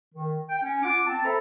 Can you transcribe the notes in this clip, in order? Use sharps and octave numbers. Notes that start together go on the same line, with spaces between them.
D#3
G5
C#4
F4 F#5 D6
C4 A5
A4 C5 E5 A#5 B5